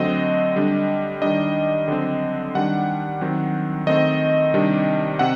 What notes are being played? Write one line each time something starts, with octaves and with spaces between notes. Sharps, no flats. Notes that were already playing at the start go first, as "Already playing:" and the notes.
Already playing: D3 F#3 A3 C4 D#5
D3 G3 D4
D#3 G3 D4 D#5
D3 F#3 C4
D#3 G3 D4 F#5
D#3 F#3 C4
D#3 A3 C4 D#5
C3 D#3 G3 D4
C3 F#5